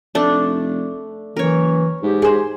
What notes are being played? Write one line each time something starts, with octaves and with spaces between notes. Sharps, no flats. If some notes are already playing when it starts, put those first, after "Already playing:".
F1 A3 D4
F#1 E3 A#4 C#5
G#2 G4
G#4 C5